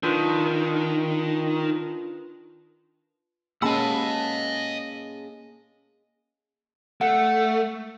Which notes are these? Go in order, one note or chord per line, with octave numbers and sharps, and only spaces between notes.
D#3 D4 F4 B4
G#3 A#3 C#4 D#5 F#5 A5 B5 E6
A3 F#5